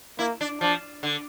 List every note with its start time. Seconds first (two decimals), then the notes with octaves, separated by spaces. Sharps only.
0.19 A#3 E4
0.41 D4
0.60 F3 D4
1.03 D3